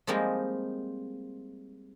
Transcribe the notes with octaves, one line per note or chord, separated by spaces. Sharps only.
F3 G3 G#3 A#3 C4 D#4